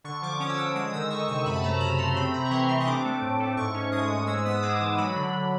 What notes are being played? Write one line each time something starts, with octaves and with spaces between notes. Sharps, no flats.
D3 C#6
F3 D6
C#4 D#6
E6
D3 D#6
G#3 D#6
D#3 E6
D#3 C#6
C3 C#6
F#2 B5
A5
A3 A#5
C#3 B5
A3 C6
C4 B5
C3 A#5
C#6
E3 C6
C4 C#6
D#6
D4 D6
A3
A2
A3
G#2 C#6
C#4
G#3 D#6
G#2
G#3 E6
E6
B3 D#6
G#3 D6
E3
F#3 B5
D3
D3